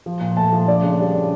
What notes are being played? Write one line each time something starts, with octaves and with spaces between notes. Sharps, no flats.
F3
A#2
A3 A5
F3
D4 D5
C#3
G3
D4